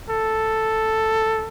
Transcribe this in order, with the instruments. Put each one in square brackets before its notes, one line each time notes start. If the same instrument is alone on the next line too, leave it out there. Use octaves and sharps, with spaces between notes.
[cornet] A4